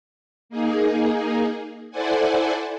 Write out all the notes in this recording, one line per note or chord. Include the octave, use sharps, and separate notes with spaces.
A#3 D#4 G#4
E4 A4 C5 D5 F#5 G#5